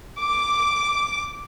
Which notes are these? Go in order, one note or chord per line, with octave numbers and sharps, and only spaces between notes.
D6